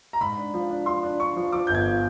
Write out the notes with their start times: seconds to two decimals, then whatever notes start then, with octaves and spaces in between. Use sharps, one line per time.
0.13 A#5
0.21 G#2 B5
0.38 D4
0.54 F3
0.70 D4
0.86 F3 C6
1.03 D4
1.20 D4 C#6
1.36 F3
1.53 F3 D6
1.67 G1 G6
1.75 G#6
1.86 F3